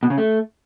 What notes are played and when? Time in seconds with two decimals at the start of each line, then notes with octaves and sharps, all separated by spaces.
0.03 B2
0.10 C#3
0.18 A3